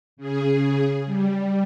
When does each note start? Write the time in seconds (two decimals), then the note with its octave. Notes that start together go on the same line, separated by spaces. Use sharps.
0.17 C#3 G#4
1.05 G3